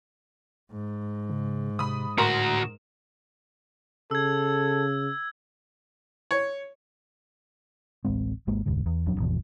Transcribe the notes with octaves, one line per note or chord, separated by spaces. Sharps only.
G#2
C#3
C3 B5 D#6
D2 A2 F#4 A#4 A#5 C6
C#3 A4 E6 G#6
C#5
D1 A1 G#3 C4
G#1 G#3 A#3
F1 D2 G#2 D3
E2
D#1 F2 F#3 D4
G#1 E2 B2 F3